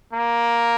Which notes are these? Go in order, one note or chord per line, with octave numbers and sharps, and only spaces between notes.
A#3